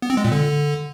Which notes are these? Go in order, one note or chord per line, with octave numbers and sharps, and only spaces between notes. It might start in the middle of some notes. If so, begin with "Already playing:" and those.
B3
C4
G#3
A#2
D3